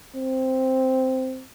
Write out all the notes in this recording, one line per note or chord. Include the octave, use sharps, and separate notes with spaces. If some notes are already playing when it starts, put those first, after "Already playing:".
C4